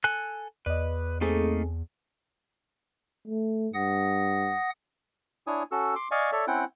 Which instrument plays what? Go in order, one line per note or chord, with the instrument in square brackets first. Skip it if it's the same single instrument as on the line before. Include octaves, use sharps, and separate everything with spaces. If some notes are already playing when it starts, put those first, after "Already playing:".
[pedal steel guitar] A4 G#5 F#6
[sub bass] E2 [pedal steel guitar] B4 [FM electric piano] D5 D#5
[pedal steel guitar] A3 A#3 D#4 [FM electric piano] C4 G#4 A4
[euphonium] A3
[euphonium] G2 [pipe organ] F#5 D#6 A#6
[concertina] D4 E4 C#5 G#5 D#6
C#4 F#4 A4 E6
C6 D6
D5 D#5 F5 G#5 C#6
A4 C#5 D5 E5
C4 C#4 E4 F#5 G5